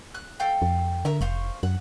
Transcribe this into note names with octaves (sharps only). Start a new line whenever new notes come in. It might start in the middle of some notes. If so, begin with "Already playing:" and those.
F#6
A4 F5 G5
F2
D3 A#4 E5
F1 C5 F5 C#6
F#2 F#5